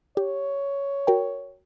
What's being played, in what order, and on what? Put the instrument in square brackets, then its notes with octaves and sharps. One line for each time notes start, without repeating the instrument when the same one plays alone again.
[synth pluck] G4 [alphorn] C#5
[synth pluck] F#4 A#4 G5